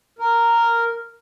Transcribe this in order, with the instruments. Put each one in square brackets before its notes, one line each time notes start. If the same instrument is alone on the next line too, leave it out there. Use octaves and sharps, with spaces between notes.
[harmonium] A#4